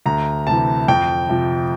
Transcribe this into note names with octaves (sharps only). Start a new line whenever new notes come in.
D2 A#5
C3 E3 A5
F2 G5
C3 F3